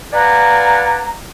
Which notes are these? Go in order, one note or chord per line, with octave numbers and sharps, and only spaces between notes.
B4 D5 F5 F#5 G#5 A#5